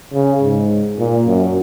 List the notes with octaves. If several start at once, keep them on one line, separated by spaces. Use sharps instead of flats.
C#3
G#2
A#2
F#2